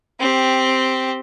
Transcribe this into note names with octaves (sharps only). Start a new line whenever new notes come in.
C4 G4